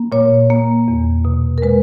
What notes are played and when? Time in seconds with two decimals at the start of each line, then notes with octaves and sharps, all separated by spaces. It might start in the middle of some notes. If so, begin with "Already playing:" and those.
Already playing: A#3
0.12 A#2 C#5
0.50 A#3
0.88 E2
1.25 B2
1.58 A#4
1.62 G#3 B4